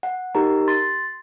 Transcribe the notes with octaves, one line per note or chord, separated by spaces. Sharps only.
F#5
D#4 G4 A#4 A#5
C6 A6